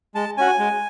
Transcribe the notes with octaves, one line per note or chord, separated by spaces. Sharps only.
G#3 A5
C#4 F#4 G#5
G#3